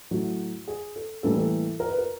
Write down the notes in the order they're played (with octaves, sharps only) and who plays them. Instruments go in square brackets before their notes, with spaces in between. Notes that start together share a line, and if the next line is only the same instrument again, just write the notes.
[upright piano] A2 F#3 A3 F#4
G#4
A4
A2 E3 G3 A#3 A4
A4
A#4
B4
A#4